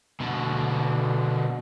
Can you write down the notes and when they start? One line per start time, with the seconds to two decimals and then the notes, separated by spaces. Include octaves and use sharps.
0.20 B2 D3